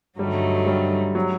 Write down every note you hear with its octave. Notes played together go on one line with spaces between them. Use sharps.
G2 D3 F#3 G3 A3 D#4
G3
F#3